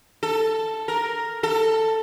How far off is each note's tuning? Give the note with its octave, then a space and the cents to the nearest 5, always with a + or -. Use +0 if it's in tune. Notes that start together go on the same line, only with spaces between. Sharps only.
A4 +5
A#4 +0
A4 +10